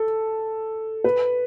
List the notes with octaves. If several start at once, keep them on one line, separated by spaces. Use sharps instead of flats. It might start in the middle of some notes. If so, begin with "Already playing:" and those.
Already playing: A4
B4